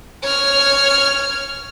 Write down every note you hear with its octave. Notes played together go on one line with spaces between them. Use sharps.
C#5 F6